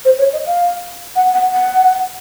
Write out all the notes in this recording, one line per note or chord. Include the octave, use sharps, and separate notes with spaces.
C5
C#5
D#5
F5
F#5
F#5
F#5